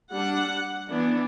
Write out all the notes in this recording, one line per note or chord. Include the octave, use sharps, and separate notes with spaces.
G3 D4 F#5
E3 B3 D4